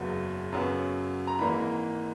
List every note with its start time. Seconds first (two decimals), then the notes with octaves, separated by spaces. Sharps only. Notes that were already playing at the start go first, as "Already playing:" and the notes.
Already playing: F#1 E2 C#3 F#3 B3
0.52 F#2 C#3 F#3 B3
1.27 A#5
1.39 G#1 G#2 E3 A#3 B5